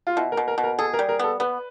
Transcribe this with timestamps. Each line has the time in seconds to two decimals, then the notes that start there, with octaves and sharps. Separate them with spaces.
0.07 F4
0.17 B2 E4
0.32 A#4
0.37 B2
0.48 A#4
0.58 B2
0.64 A#4
0.79 G#4 A4
0.94 A#4
0.99 G3
1.09 A#4
1.19 B3 A4
1.40 B3 B4